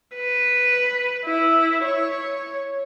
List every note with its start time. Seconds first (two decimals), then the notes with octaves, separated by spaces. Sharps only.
0.15 B4
1.25 E4
1.84 C#5